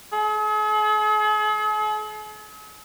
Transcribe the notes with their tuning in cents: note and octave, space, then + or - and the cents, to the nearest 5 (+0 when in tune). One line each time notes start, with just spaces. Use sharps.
G#4 +45